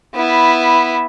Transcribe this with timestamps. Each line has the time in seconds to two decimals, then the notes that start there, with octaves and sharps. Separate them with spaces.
0.15 B3 E4